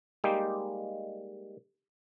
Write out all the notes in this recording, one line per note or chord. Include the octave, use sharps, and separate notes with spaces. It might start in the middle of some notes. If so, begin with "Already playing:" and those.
G3 G#3 A#3 D#4 G4